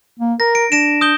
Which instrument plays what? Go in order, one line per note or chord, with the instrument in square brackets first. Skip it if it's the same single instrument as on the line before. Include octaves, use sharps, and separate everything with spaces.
[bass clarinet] A#3
[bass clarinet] A#4 [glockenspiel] A#6
[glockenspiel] D7
[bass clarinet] D4 [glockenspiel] A#6 D7 E7
[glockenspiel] D#6 G6 G7